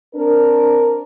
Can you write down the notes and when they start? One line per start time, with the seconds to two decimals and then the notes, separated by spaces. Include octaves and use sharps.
0.16 C4 D4 A#4